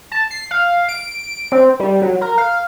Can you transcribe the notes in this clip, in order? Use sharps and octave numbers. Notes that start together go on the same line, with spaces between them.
A5
C7
F5
D7
C4
G3
F#3
A#4
F5